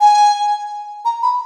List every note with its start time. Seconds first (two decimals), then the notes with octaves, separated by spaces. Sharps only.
0.01 G#5
1.05 A#5
1.23 B5